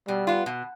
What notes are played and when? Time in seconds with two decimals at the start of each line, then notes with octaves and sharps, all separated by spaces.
0.08 B2 G3
0.27 B3 F4
0.46 B2